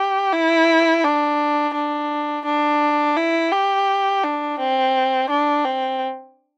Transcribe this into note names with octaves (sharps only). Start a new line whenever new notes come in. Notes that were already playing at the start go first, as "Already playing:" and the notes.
Already playing: G4
E4
D4
D4
D4
E4
G4
D4
C4
D4
C4